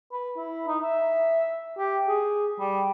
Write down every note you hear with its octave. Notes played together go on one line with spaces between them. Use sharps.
B4
E4
D#4
E5
G4
G#4
G3